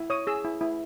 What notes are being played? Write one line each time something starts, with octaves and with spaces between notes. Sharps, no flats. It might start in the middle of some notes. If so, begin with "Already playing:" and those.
Already playing: E4
C#5 D#6
G#4 E6
E4
E4